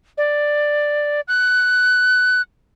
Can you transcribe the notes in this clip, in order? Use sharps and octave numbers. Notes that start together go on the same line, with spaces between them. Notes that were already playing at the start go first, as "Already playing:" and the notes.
D5
F#6